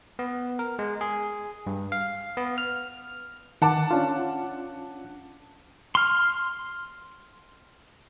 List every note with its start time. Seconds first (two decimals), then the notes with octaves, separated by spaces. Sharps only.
0.19 B3
0.59 A#4
0.79 G#3
1.01 G#4
1.67 G2
1.92 F5
2.37 B3
2.58 F6
3.62 D#3 F#5 A5 D6
3.91 C#4 D4 F4
5.95 C6 F6